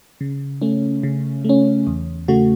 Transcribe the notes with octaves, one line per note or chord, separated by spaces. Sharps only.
C#3
A3 C#4
C#3
A3 C#4
E2
C#3 A3 F#4